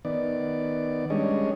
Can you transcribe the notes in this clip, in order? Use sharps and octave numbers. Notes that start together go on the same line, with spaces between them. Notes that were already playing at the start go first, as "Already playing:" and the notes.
D#3 B3 D5
G3 G#3 C#4 D4 C#5 D#5